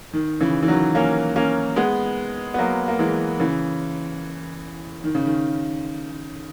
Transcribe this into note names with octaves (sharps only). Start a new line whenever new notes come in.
D#3
C#3 E3
E3
D#3 F#3
A#3 C#4
A#3 C#4
G#3 B3
B3
F#3 A#3
A#3
E3 G#3
C#3 E3
D#3
C#3
D#3